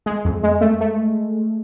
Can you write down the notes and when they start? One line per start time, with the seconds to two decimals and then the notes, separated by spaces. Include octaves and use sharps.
0.06 G#3
0.25 F2
0.43 G#3
0.61 A3
0.81 A3